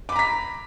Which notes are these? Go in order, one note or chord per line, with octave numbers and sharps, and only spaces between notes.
A#5 B5 D6 B6